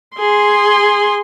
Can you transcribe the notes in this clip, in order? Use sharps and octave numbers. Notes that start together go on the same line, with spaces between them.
G#4 C6